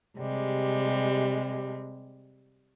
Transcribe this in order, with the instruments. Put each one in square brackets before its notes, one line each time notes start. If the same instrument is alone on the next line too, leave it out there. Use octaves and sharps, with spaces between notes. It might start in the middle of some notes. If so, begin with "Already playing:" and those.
[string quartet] C3 G3 G#3